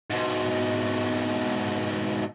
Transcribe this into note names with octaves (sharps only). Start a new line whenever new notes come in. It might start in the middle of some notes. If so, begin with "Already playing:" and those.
G#2 B2